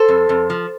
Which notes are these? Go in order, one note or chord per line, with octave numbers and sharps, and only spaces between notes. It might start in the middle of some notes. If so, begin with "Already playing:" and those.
Already playing: A4 C5
F2
F2
F3